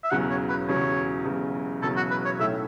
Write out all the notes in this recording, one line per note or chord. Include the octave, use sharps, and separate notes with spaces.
E5
E1 E2 C#3 F#3 F#5
C#5
B4
E1 E2 C#3 F#3 C#5
E1 E2 C#3 F#3
E1 E2 C#3 F#3 A4
F#4
B4
C#5
B1 A2 A3 C#4 E5